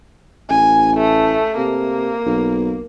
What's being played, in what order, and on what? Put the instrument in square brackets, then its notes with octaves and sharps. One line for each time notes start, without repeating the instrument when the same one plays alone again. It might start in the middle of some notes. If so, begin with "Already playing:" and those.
[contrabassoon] A1 [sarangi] G#5
[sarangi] A3
[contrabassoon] C3 [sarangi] A#3
[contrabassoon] B1